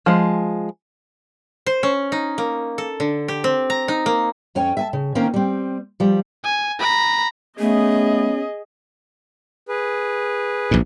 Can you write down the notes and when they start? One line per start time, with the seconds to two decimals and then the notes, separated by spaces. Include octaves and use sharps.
0.06 F3 G#3
1.66 C5
1.83 C#4
2.12 D#4
2.38 A#3
2.78 A4
3.00 D3
3.28 G4
3.44 C4
3.70 A#5
3.88 D#4
4.06 A#3
4.55 F2 C#4 C#5 G5 G#5
4.77 E5 G#5 A5
4.93 C#3
5.15 D#3 A#3 C4 C#4 A#4 C5
5.34 G3 C4
6.00 F3 G3
6.44 G#5
6.79 A#5 B5
7.59 A3 B3 C#4 G#4 D#5
9.68 G#4 B4
10.71 A#1 G#2